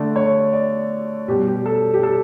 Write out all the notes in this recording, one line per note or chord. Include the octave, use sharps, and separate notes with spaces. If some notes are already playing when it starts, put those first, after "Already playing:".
Already playing: D3 A3 D5
C#5
D5
B2 G3 G4
G4
A4
G4
A4